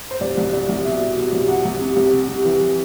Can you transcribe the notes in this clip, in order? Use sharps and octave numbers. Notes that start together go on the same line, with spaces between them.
C5
C2 D5
C2
C2 D5
C2
B2 E5
B2
B2
C2
C2 F#5
C2
C3
C2
C3
C3
E3
E3